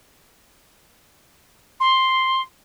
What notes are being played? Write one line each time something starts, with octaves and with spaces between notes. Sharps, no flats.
C6